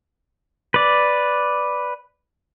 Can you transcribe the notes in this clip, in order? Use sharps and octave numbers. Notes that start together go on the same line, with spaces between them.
B4 D5